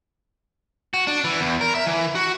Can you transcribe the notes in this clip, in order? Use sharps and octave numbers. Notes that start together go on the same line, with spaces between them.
F#4
D4
E3
E2
A#4
E5
E3
F#4